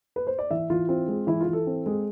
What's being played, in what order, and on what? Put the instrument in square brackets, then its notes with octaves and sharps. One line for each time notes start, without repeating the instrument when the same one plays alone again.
[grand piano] B4
C5
D5
E3 E5
E3 F4
C4 F4
G#3
E3 E4
F4
E3
A4
C4
G#3